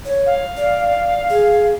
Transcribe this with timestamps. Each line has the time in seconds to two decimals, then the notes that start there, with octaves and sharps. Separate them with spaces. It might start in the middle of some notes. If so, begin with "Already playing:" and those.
0.05 C#5
0.26 F5
0.57 D5
1.30 G#4